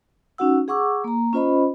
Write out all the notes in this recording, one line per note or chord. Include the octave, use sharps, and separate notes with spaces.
C#4 D#4 F#4 F#5 E6
G#4 F#5 C#6 D6 E6
A#3 A#5
C#4 F4 C5 D#5 B5